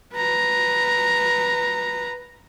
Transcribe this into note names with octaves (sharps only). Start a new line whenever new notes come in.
B4 A#5